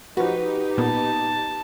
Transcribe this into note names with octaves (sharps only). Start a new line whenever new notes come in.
F3 D#4 F#4 G4 B4
A#2 B3 A5